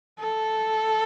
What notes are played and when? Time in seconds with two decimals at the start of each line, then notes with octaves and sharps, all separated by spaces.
0.20 A4